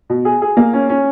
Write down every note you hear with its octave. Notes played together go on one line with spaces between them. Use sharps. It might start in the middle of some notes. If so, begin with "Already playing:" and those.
B2
G#4
G#4
A#3
C#4
C#4